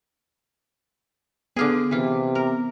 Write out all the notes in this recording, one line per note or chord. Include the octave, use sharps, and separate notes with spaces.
D3 B3 F4 G#4 D6
C3 E3 F4
A#4